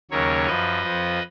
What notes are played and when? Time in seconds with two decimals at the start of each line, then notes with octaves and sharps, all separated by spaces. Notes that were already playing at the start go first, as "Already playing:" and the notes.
0.11 D#2 C#3 F#3 A#4 C#5
0.47 F#2 F3 B4 D#5
0.83 F2 F3